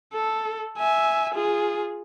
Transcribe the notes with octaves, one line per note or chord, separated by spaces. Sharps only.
A4
E5 G#5
F4 G#4